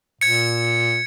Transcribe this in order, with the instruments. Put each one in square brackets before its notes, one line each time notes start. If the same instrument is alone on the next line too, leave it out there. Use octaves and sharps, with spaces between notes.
[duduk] A#2 [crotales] G#6 C#7